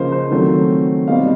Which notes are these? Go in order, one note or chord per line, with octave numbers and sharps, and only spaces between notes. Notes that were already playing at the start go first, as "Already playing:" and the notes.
Already playing: C#3 F3 A#3 C5 D#5
C5
D#3 F#3 A3 C4
B2 G3 C4 D#5 F5